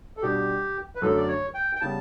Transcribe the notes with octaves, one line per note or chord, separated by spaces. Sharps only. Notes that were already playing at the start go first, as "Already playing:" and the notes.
A4
B2 G3 D4 G4
B4
F#2 D3 F#3 A3 A4
D5
C#5
G5
G5
C#3 G3 B3 A5